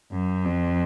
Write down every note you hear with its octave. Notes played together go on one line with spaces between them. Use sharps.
F#2
F2